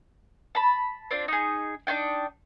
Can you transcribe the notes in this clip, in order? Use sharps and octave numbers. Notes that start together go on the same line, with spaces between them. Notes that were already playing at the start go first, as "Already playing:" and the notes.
A5 B5
C4 D4 F4
D#4 G#4
D4 D#4 F4 G5